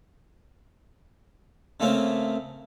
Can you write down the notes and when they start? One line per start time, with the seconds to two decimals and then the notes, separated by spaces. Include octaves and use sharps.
1.80 C#3 A3 A#3 C4 C#4